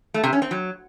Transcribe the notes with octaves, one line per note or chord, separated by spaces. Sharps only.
A3
C3
C#4
C4
F#3